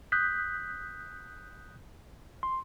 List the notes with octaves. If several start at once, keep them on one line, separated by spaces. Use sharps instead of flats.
D#6 F#6 G6 B6
C6